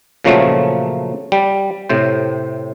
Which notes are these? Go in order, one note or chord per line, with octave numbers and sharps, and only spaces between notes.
A#2 C#3 F3 F#3 A3
G3
A2 C3 C5